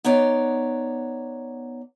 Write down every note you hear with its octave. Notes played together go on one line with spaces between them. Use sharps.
B3 D#4 C#5 D5